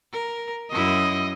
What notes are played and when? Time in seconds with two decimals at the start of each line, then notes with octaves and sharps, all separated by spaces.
0.12 A#4
0.72 F#2 E4 D#5